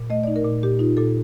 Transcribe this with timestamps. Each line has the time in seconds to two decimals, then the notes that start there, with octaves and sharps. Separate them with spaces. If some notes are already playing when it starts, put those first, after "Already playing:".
Already playing: A#2
0.10 A3 D#5
0.23 D#4 D5
0.36 A#4
0.45 A#2
0.63 A#2 G4
0.79 D#4 F4
0.97 A#2 A4